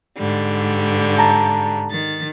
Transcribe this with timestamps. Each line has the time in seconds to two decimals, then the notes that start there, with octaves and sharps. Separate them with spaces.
0.17 G#2 D3 G3
1.18 A5 A#5
1.90 D#3 A6